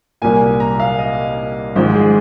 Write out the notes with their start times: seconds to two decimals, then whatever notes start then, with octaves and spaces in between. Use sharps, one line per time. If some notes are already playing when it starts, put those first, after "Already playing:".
0.22 C2 A#2 A#3 G#5
0.60 A#5
0.80 F5
0.99 D#5
1.75 G#1 G#2 F3 G#3 C5
1.95 G#4